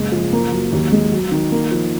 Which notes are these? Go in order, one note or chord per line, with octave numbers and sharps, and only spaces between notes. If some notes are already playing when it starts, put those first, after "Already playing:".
Already playing: F#1 G#3
F3
A#3
F#3
D#2
G#3
F#3
D#3
A#3
F3